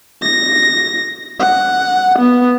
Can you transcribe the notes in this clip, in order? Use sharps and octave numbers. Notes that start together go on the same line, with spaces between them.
A#6
F#5
B3